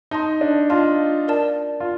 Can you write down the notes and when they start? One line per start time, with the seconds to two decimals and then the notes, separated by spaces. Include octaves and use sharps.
0.11 D#4 D#5 A5 C6
0.41 D4
0.70 F4 D#5 A5 C6
1.28 A#4 D5 A5
1.80 F4